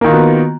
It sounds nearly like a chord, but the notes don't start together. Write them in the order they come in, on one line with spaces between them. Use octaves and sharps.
A#3 D#3 F4 F#4 B3